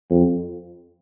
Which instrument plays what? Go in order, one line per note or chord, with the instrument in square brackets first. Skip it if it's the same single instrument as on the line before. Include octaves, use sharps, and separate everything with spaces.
[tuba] F2